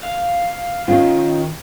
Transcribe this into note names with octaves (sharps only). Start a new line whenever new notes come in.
F5
D#3 C#4 F4